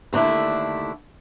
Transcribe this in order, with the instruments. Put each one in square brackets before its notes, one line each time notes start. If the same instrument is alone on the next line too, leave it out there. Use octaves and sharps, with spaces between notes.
[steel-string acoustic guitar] D#2 D3 A3 D4 E4